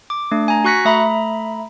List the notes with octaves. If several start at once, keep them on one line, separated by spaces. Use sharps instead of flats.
D6
A3 D4
G#5 A#5
F#4 C#6 F#6 A#6 B6 C#7
A3 E5 A#5 B5